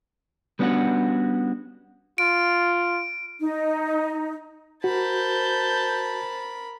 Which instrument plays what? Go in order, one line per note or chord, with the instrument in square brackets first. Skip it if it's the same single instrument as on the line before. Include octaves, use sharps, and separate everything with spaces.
[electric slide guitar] G3 B3 C#4 D4 F#4 F#5
[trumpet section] F4 [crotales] D7
[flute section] D#4
[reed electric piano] F#4 [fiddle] A#4 B5 [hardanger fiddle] C5 A5 [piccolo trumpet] G6